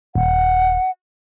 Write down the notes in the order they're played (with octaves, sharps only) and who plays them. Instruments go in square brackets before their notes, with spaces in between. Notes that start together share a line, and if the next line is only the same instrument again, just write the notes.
[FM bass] D#1 [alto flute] F#5